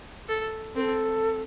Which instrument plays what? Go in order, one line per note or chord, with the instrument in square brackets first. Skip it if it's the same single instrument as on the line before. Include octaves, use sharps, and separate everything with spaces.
[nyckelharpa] A4
[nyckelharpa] C4 [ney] A#4
[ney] A4